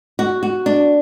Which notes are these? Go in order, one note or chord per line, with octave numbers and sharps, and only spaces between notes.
F#4
F#4
D4